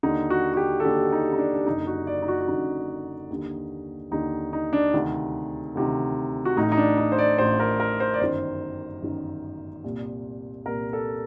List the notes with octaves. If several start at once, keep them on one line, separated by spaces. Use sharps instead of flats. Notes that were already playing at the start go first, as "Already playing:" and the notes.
D#2 D3 D#4
F#4
F#4
G4
A4
D#2 D3 G4
D#4
D#4
D4
D4
F#1 F#2 D3 D#4
F#4
D5
D#4
F#4
F#4
F#1 F#2 D3 D#4
D#2 D3
D#2 D3 D#4
D#4
D4
D2 C3 D#3
D2 C3 D#3
F#4
A1 A2 D#4
D#4
D4
D#4
C5
D5
A1 A2 C5
A#4
A#4
C5
D5
G1 F#2 D#3 C5
G1 F#2 D#3
C2 A#2
C2 A#2 A#4
A4